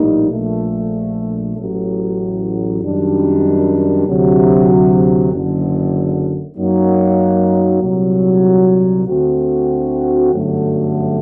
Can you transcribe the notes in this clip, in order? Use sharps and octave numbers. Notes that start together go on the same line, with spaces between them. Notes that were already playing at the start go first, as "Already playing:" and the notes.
Already playing: A#1 A2 G3 A#3 D#4
A#1 A#2 A3
A1 A2 F#3
F#2 D#3 G3 D4
D2 C3 F#3
F#1 F#2 D3
F#2 F#3 A#3 D#4
C2 A#2 F#3
D2 D3 A3 C4 F#4
G1 F#2 D3 F#3 A3